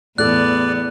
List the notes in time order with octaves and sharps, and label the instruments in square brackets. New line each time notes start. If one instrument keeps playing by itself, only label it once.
[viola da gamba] E2 B3 [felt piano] A2 A4 E6 [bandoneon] D5 [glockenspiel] F#6